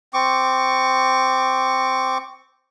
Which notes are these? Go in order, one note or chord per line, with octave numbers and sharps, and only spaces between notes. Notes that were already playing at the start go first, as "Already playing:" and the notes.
C4 C#6 D6